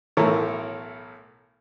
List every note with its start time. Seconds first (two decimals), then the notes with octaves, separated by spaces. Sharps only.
0.17 B1 A2 E3 A4 A#4 C#5